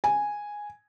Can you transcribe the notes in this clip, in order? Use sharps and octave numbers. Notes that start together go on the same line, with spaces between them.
G#5